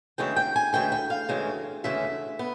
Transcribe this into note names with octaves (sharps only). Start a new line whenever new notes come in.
D2 C#3 E3 G#3 G5
G5
G#5
D2 C#3 E3 G#3 G5
G5
F5
D2 C#3 E3 G#3
D2 C#3 E3 G#3 E5
B3